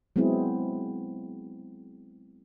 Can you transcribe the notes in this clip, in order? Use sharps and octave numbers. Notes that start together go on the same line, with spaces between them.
F#3 G#3 B3 C4 E4 G#4